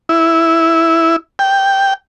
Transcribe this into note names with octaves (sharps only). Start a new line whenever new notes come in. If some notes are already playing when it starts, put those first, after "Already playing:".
E4
G5